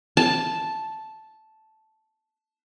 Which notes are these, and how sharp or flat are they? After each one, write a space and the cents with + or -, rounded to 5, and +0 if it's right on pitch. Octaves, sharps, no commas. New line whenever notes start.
A5 -5